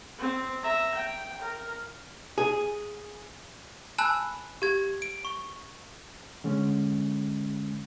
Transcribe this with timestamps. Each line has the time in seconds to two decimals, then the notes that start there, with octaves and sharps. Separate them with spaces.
0.19 C4
0.63 E5 A#5
0.95 G5
1.41 A#4
2.38 G#4
3.98 G#5 A5 B5 E6 F#6
4.62 G4 G#6
5.02 D7
5.25 C#6
6.44 D3 G#3 C#4